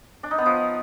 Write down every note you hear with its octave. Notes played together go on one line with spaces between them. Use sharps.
D4
D#4
B3
F3